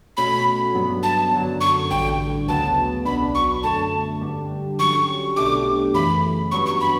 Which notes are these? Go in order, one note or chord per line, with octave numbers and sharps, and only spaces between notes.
B2 A3 C#4 F#4 C#5 B5
G2 F#3 B3
A5
F#2 D3 F#3
C#6
A1 G2 D3 G5
D2 C#3 F#3 B3 A5
B1 B2 F#3 B3 D4 B5
C#6
F#2 D3 A3 A5
G2 D3 G3 D4 G4
D3 F#3 C#4 G4 C#6
B1 B2 A3 D4 G4 D6
F#2 C#3 E3 A3 B5
G2 F#3 B3 C#6
C#6
B5